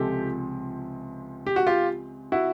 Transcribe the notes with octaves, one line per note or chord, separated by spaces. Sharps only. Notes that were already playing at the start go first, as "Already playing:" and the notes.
Already playing: C#2 C3 F3 G#3 G4 A4
G4
F#4
F4 G4
E4 F#4